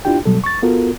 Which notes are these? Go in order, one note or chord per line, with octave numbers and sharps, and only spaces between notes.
D4 E4 F4 G4 G5
B2 F#3 G3 A4
C#6 A6
B3 F4 F#4 A4 A#4